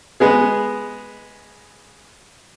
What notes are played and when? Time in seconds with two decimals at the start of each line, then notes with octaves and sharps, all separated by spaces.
0.20 G#3 B3 G#4